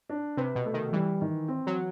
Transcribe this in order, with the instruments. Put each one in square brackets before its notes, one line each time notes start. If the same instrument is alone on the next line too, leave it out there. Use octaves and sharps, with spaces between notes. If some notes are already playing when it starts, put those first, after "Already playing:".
[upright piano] D4
[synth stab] C3 [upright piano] B4
[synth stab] B2
[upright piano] A3
[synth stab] D#3
[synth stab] E3 [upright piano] G3
[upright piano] D#3
C4
[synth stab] F#3